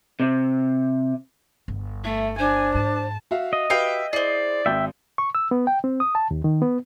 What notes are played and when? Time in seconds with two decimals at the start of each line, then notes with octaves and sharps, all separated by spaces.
0.20 C3
1.68 G1
2.04 A3 E5
2.39 D4 C5 G#5
2.75 G#2 A5
3.31 F#4 E5 F5
3.53 D#5
3.70 F#4 G4 B4 E5 F5 G5
4.13 E4 G#4 C5 D5
4.66 G#1 E5 G5 G6
5.18 C#6
5.35 E6
5.51 B3
5.67 G5
5.84 C4
6.00 D#6
6.15 A5
6.31 D#2
6.44 D#3
6.62 B3